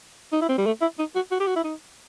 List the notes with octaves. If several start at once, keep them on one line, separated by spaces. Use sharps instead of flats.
D#4
E4
C4
G3
A3
E4
D#4
F#4
F#4
G4
F#4
E4
D#4